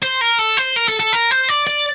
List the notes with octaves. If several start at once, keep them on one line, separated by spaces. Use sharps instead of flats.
C5
A#4
A4
C5
A#4
A4
A4
A#4
C5
D5
D5